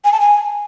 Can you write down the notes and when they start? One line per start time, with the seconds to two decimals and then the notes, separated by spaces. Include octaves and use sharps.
0.04 G#5
0.12 A5
0.20 G#5